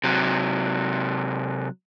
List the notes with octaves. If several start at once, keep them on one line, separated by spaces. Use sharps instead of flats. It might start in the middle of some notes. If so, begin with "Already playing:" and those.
C3 F#3